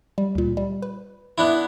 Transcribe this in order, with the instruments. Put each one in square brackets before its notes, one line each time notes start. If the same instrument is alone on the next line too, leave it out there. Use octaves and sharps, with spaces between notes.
[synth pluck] G3
D2 A#2
G3
B4
[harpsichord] B3 D4 E4